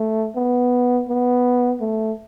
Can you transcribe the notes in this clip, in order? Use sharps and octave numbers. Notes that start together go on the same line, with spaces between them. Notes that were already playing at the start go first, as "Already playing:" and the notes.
Already playing: A3
B3
B3
A3